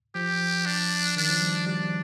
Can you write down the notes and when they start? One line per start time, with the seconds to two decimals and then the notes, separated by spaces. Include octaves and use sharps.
0.15 F3 G4
0.66 D4
1.16 D#3 D4
1.29 F3
1.41 G3
1.66 G3 D4